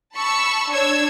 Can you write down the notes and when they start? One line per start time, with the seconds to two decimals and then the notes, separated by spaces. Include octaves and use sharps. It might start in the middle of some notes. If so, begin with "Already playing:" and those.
0.15 A5 B5 C#6 E6
0.70 D4 C#5 E6 G#6